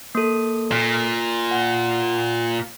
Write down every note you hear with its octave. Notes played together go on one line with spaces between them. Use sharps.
A#3 A4
A#2
F#5